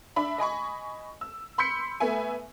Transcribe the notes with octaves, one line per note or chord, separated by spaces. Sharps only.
D4 E5 B5
D#5 G#5 B5 C#6
E6
B5 C6 E6 G6 B6 C#7
A3 B3 E5 G#5